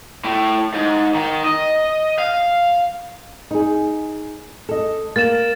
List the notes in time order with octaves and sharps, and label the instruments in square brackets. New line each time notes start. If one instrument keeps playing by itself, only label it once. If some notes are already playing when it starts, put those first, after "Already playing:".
[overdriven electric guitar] A2
G#2
D#3
D#5
F5
[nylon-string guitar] D#4 G#4
A4 D#5
[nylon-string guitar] A#3 [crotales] A6 E7